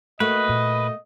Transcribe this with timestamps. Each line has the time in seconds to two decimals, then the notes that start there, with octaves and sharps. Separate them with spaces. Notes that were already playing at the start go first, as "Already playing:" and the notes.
0.20 A3 A#3 F#4 B4 D#5
0.49 A#2